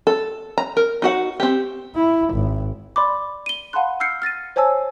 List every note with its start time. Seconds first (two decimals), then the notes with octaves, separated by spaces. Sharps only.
0.07 A4
0.58 A#5
0.77 A#4
1.02 D#4 F#4 F#5
1.40 C4 G4
1.95 E4
2.34 G#1
2.96 D5 B5 C6 D6
3.46 D#7 G7
3.73 F5 F#5 A5 B5 C6 F#6
4.00 E6 F6 G6 C7 C#7
4.22 F6 A6 A#6 D#7
4.56 C5 C#5 G#5 A5 E6